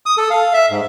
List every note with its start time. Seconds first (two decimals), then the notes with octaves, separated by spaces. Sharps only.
0.06 D#6
0.18 A4
0.31 F5
0.54 E5
0.70 G#2